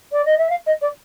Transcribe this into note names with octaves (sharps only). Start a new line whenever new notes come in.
D5
D#5
E5
F5
D#5
D5